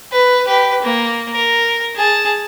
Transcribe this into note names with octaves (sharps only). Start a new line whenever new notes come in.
B4
G4 B4
A#3
A#4
G#4 A5